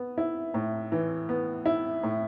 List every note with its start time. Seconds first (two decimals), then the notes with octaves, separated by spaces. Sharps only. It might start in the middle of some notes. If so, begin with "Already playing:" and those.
Already playing: B3
0.18 E4
0.54 A2
0.92 E3
1.29 B3
1.66 E4
2.03 A2